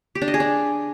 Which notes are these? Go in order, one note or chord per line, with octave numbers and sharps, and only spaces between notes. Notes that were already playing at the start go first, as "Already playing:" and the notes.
G4
D4
D#5
G#4
D4